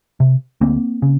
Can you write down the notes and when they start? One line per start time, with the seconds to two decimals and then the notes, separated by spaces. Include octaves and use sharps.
0.20 C3
0.61 D2 A#3 C4
1.02 C#3